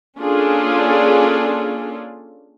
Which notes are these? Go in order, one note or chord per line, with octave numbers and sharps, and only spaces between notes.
A#3 C#4 D4 F4 G#4 A4